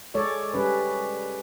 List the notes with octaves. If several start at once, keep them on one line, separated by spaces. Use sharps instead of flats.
G#3 A4 C#5 D5
G3 C#4 B4